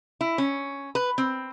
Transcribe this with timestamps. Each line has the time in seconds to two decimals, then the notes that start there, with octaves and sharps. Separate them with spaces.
0.21 E4
0.38 C#4
0.95 B4
1.18 C4